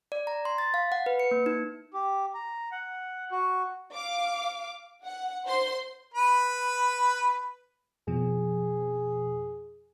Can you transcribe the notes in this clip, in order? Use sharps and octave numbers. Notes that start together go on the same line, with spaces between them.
D5
A#5
C6
A6
F5
F#5
B4
C#7
A#3
D#4
G4
A#5
F#5
F#4
F5 D6
F#5
C5 C6
B4 B5
F2 B2 F3 G#4